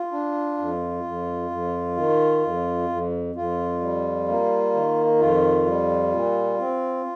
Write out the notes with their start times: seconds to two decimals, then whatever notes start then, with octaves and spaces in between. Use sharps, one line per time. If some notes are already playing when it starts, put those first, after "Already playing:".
Already playing: F4
0.12 D4
0.58 F2
1.04 F2
1.50 F2
1.97 D#3
2.43 F2
2.89 F2
3.35 F2 F4
3.81 G3
4.28 A#3
4.74 D#3
5.20 F2 F4
5.66 G3
6.12 A#2
6.59 C4